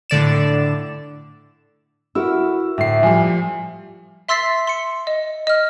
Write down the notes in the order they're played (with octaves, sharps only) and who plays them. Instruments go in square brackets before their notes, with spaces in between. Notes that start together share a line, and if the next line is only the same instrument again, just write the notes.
[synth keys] A2 D3 D5 E7
[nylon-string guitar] E4 F#4 A#4 [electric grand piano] E6
[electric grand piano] D2 C7 [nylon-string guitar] A2 [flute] E5
[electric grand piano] F3 G3 [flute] G#5
[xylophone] E5 C6 E6 A6 B6 C7
C6 C#7
D#5
D#5 F6